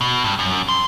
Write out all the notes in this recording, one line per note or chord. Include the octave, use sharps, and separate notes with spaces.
B2
G2
F#2
C6